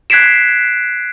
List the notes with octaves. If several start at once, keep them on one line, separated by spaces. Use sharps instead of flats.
F#6 G#6 B6 C7 D7 E7